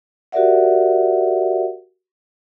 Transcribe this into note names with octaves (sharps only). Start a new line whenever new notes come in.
F#4 G4 A#4 D5 E5 F#5